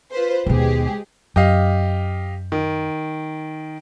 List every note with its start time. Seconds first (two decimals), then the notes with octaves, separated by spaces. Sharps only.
0.11 F4 B4 C5
0.46 D#2 B2 G#3 G4 G#4
1.36 F#2 G4 D#5 F5
2.52 D#3